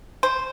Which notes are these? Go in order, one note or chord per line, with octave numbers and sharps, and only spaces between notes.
C5